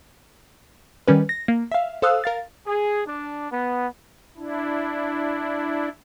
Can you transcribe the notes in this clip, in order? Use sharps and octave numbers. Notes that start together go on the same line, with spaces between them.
D#3 G3 C#4 B4
A#6
A#3
E5 F5
A4 C5 F5 D#6 E6 F#6
A#4 F5 A6
G#4
D4
B3
D4 E4